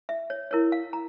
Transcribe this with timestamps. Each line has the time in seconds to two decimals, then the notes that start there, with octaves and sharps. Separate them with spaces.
0.09 E5
0.30 C#5
0.51 E4 A#4 C#5
0.72 F5
0.93 A#5